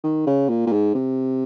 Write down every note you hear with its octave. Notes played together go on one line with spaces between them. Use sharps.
D#3
C#3
A#2
A#2
G#2
C3